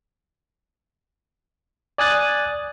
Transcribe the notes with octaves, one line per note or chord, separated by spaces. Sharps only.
D5 G#5 D#6 F#6 A6